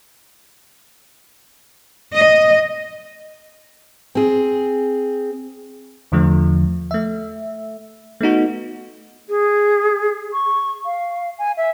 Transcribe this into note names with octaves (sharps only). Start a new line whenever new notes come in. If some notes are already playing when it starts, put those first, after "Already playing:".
D#5
C4 G#4
E2 D3 F3 A3
A3 E5
A3 B3 D#4 F#4
G#4
C#6
F5
G#5
E5